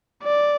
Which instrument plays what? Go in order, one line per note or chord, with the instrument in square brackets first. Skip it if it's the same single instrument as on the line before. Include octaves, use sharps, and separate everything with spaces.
[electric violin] D5